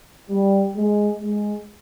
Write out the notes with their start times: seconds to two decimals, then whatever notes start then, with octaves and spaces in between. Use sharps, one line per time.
0.30 G3
0.76 G#3
1.21 G#3